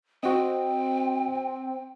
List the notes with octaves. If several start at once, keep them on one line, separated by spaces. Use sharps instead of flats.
C4 F#4 D#5 G5